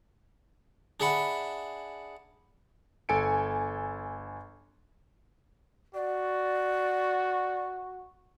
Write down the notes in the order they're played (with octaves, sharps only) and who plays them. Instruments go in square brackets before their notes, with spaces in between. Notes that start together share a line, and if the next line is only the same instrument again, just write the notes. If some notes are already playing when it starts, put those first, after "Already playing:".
[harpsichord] D4 G#4 E5 F#5 B5
[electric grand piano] G1 A4 G#5 C#7 D7
[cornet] F#4 [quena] D5